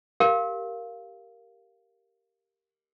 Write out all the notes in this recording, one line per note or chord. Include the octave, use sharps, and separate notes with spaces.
G4 A#4 F5